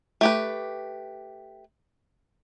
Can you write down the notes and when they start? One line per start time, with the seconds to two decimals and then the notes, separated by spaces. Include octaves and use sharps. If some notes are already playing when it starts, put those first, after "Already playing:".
0.21 A3 G4 B4